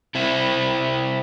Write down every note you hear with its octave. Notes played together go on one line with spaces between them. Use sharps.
C3 C4 E4